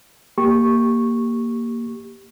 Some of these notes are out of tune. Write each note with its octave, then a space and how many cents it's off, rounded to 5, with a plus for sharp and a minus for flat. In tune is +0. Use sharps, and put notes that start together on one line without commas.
A#3 +0 G4 +5 C#6 -10